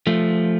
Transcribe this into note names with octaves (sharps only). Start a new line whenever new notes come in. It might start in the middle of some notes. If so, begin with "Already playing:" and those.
F3 A3